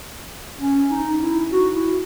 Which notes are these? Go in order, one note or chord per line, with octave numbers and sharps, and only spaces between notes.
C#4
D#4
E4
F#4
E4